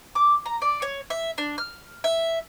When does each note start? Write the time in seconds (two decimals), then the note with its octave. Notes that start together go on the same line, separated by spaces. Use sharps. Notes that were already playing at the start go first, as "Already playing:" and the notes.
0.15 D6
0.46 A#5
0.62 D5
0.82 C#5
1.10 E5
1.38 D4
1.58 F6
2.04 E5